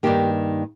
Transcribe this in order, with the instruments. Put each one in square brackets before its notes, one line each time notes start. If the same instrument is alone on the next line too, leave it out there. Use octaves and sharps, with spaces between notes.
[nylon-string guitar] G2 D#3 A#3 G4